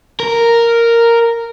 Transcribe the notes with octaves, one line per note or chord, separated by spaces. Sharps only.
A#4